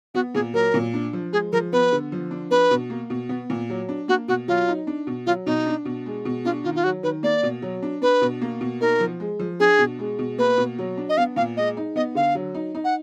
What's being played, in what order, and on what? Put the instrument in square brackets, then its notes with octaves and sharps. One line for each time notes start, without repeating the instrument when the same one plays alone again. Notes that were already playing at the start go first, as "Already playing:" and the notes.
[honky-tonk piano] B3 [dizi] F#4
[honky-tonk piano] A#2 [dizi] G#4
[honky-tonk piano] F#3 [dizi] A#4
[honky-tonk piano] A#2
D4
F3
[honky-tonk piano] G#3 [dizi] G#4
[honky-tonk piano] F3 [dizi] A#4
[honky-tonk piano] B3 [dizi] B4
[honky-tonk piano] D3
F3
D4
[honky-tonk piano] D4 [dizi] B4
[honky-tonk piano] B2
A#3
B2
B3
A#2
F#3
D4
[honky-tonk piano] A#3 [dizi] F#4
[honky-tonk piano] B2 [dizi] F#4
[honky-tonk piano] F#3 [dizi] F4
[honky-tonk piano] D#4
D4
B2
[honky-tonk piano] F#3 [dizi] F4
[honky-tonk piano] B2 [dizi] D#4
[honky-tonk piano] D4
B2
G#3
B2
[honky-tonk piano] D4 [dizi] F4
[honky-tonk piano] D#3 [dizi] F4
[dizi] F4
[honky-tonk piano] F#3 [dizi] F#4
[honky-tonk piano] D#3 [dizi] B4
[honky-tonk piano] A#3 [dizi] D5
[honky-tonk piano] B2
F#3
D4
[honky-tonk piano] D4 [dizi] B4
[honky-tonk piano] B2
A#3
B2
[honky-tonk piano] D#4 [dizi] A#4
[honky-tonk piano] F3
G#3
F3
[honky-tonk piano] D4 [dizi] G#4
[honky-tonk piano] B2
G#3
B2
[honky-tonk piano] A#3 [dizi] B4
[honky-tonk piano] B2
F#3
D4
[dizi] D#5
[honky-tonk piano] B3 [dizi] F5
[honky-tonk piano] A#2 [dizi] F5
[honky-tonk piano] G#3 [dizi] D#5
[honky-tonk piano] D#4
[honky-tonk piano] B3 [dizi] D#5
[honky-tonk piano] D3 [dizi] F5
[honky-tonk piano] F#3
D#4
D#4
[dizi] F#5